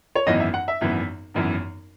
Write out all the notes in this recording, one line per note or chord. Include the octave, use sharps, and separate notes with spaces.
C#5
G#1 F#2 E3 B3 D#5
E5
F#5
E5
G#1 F#2 E3 B3
G#1 F#2 E3 B3